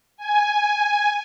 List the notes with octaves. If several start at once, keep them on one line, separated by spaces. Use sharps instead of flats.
G#5